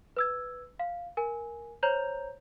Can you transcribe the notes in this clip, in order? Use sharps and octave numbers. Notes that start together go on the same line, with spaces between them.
B4 E6 G#6
F5
A#4 G#5
C5 C#5 A#5 G6 F7